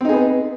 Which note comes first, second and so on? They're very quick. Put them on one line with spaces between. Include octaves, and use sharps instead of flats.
C4 D#4 G#4 B3